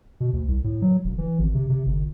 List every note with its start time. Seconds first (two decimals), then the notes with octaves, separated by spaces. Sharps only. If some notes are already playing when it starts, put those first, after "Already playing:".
0.20 B2
0.33 D2
0.48 C2
0.64 A2
0.82 F#3
1.04 E1
1.18 E3
1.39 G#1
1.54 C3
1.69 C3
1.86 G1